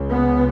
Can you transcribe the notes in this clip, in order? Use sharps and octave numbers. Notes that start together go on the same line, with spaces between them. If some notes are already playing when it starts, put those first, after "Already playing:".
Already playing: C#2 C#3
B3